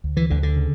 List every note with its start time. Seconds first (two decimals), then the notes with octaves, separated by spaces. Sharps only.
0.04 D2
0.17 E3
0.30 D2 D3
0.43 D3
0.56 C#3